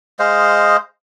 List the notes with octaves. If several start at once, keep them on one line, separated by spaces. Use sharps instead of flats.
G#3 C5 D#5 F5